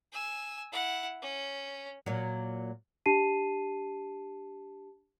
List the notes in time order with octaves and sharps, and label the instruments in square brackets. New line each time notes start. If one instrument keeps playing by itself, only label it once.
[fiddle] G#5 E6
E4 F#5
C#4
[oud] A#2 F#3
[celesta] D4 G4 A5 C7 D#7